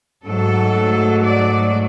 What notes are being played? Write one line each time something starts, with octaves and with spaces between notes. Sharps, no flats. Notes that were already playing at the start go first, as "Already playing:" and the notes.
G#2 F#3 A3 A4
D5